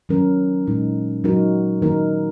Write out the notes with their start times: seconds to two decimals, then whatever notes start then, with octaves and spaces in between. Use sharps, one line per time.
0.09 D#3 F#3 C#4 A#4
0.67 A#2 G#3 D#4
1.24 F#3 D#4 F#4 A#4
1.82 D#3 A#3 D#4 A#4